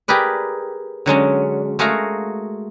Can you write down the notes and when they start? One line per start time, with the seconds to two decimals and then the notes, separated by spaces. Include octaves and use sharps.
0.08 G4 G#4 A#4 B4 D5
1.06 D3 F#3 G#3 C#4
1.79 G#3 A3 F#4 G#4 A#4 F5